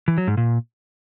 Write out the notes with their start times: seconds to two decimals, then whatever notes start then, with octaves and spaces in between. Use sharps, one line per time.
0.08 E3
0.18 F#3
0.27 G#2
0.37 A#2